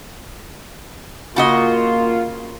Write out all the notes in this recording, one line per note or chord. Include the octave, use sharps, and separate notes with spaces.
C#3 A#3 F4 F#4 D#5